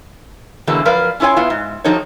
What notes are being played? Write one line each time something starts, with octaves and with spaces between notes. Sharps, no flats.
B2 D3 E3 F#3 G#3 A#3
F3 F#3 A#4 B4 D5 F5
C#4 E4 F4 C#5 G#5
B3 E4 F4
G#2
F3 F#3 D#4 G4 A4 C#5